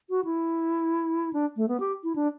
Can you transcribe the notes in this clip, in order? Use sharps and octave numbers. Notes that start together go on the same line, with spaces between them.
F#4
E4
D4
A3
B3
G4
E4
D4